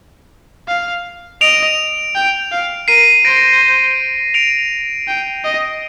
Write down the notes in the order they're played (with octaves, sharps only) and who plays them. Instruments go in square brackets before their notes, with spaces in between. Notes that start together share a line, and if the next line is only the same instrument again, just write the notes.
[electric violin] F5
[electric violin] D#5 [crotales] D7 F7
[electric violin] G5
F5
[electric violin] A#4 [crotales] C7 D#7
[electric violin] C5 [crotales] A#6 D7
[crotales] D7 F7
[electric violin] G5
D#5